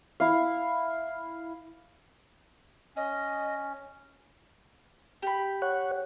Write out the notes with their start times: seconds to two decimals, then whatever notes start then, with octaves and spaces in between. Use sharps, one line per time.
0.20 E4 F5
2.96 C#4 D#5
5.23 G4 B5
5.62 C#5 F#5